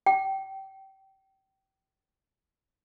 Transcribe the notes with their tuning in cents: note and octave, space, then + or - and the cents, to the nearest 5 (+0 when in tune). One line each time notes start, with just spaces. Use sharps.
G5 -25